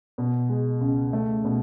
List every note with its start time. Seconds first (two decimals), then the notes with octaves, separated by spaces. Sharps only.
0.18 B2
0.49 G#3
0.80 C#2
1.13 A3
1.45 B2